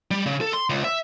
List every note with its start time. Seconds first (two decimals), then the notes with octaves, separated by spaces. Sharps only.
0.11 G3
0.26 C#3
0.41 A4
0.53 C6
0.70 C#2
0.84 E5